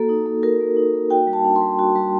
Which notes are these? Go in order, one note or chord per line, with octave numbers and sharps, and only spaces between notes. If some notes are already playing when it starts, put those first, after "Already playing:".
Already playing: A#3 F#4 A4
D#4
A#3
F#4 A#4
A#3
D#4
A#3
F#4 G5
G3
A5
D4
C6
G3
F#4
G3